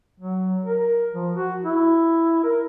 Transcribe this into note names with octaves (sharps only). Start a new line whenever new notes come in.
F#3
A#4
F3
F#4
E4
A#4